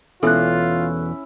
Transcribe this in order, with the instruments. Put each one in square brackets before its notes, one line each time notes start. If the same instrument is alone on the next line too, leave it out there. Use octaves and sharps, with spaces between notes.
[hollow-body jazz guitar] E2 B2 E3 [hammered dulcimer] C#4 E4 [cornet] F4 [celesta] A4 F#6